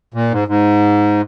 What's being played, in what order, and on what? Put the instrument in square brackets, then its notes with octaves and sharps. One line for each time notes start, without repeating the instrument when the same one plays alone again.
[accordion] A#2
G#2
G#2